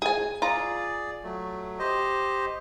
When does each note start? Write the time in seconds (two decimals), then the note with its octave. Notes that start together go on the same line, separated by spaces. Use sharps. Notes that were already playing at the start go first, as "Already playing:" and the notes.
0.02 G#4 G#5
0.42 F4 G#4 D5 A#5
1.24 F#3 A3
1.79 G4 C5 D#5